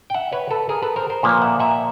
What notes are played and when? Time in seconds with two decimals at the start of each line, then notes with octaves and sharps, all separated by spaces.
0.10 G5
0.14 E5 F#5
0.32 B4 C#5
0.51 A4 B4
0.69 G#4 A#4
0.82 A4 B4
0.96 A#4 C5
1.10 A#4 C5
1.23 A#2 F3 A#3 B4 C#5
1.42 E5 F#5
1.59 E5 F#5